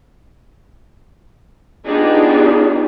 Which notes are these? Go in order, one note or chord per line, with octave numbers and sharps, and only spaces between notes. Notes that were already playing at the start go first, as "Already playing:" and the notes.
B3 D4 D#4 F4 G4 G#4